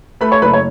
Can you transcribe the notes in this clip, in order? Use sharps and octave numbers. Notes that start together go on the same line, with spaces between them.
A3 B4 B5
C#5 C#6
F#1 B4 B5
C#5